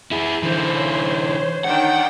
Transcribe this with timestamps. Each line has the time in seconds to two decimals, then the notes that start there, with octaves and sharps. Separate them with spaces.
0.11 E4 G#4
0.43 D3 E3 C5 G6
0.74 C#5
1.64 D#3 D4 F#5 G5